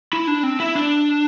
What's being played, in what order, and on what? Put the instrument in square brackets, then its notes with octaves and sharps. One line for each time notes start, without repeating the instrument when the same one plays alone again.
[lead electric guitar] E4
D4
C4
E4
D4